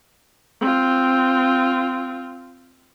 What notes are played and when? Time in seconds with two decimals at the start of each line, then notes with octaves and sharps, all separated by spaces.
0.61 C4 F4